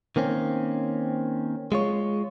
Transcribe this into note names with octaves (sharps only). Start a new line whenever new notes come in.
D#3 A#3 C4 C#4
G#3 F4 C#5